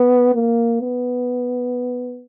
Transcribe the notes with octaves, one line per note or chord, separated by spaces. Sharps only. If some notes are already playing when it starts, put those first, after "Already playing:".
Already playing: B3
A#3
B3